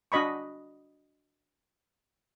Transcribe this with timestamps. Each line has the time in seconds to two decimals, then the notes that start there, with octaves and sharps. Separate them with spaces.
0.12 D4 F#4 D#5 B5 C#6